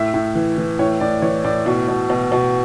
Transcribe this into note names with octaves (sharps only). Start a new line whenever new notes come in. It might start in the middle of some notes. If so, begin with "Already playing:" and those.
Already playing: A2 E5
A2
E3
E3
A2 C#5
A2 D5
E3 C#5
A2 D5
B2
B2
B2
B2